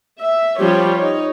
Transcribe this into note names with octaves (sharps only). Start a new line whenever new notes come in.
E5
F3 G3 C#4 G4 C#5
D#4 C#5